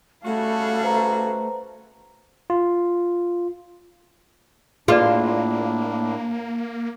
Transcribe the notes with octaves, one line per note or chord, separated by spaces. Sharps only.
C#3 G3 A3 F#4 A4 F5
B4 C5 A#5
F4
A2 A#3 D4 F4 G#4 B4 D5